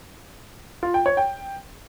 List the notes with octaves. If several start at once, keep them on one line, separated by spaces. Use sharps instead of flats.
F4
G5
C#5
G5